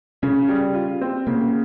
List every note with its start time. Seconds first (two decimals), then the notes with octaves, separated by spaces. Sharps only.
0.23 C#3 C#4
0.48 G3
0.74 F4
1.01 C4
1.27 C#3 A#3